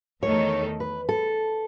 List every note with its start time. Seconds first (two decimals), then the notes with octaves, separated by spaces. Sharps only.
0.22 E2 D#3 A3 D#4 A4 C#5
0.80 B4
1.09 A4